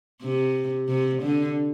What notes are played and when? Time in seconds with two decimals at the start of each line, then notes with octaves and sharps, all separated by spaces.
0.23 C3
0.89 C3
1.23 D3